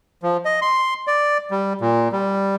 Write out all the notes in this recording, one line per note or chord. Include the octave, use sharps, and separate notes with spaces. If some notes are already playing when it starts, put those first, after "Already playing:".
F3
D#5
C6
D5
G3
A#2
G3